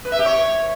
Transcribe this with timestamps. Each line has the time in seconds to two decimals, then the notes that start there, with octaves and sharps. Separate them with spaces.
0.05 B4
0.12 E5
0.19 G4
0.26 C#5